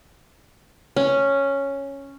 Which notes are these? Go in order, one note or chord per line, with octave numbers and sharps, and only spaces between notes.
C#4